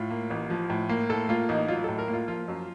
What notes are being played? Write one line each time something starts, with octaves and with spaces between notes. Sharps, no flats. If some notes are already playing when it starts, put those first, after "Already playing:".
Already playing: A2 F4
A#3
A1
F3
A2
A#3
A2 A4
A#3 F4
A1 D#4
F#3 F4
A2 A4
A#4
A#3
F4
F3 F4
F#2